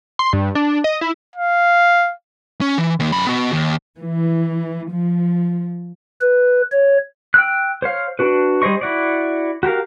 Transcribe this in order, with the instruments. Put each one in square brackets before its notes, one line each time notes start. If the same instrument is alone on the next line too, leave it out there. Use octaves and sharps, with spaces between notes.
[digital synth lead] C6
G2
D4
D#5
E4
[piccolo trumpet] F5
[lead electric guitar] C#4
E3
D#3 A#3
F#2 B5
B3 F#4
D#2
[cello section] E3
F3
[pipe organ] B4
C#5
[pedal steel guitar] G5 E6 F#6
C5 C#5 F5
D4 F#4 B4
G3 G#4 C5 D#5 C#6
E4 F#4 D5
F#4 G4 A#4 F5